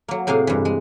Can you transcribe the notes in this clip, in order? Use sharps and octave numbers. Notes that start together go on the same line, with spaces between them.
F#3 A#3
A2 C3 A#3 G#4 F5
G2 E3
G#3